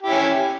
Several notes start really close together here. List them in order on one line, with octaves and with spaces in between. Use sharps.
G4 E4 C#4